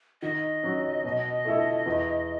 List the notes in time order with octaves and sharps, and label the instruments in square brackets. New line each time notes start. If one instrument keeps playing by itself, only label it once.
[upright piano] D#3 [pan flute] D#5
[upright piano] F#3 C#4
B2
A3 E4 A4
E2